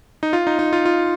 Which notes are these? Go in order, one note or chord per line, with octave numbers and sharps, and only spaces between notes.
D#4
F4
D#4
D#4
F4
F4